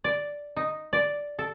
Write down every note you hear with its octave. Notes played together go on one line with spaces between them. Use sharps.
D5
D#4
D5
A4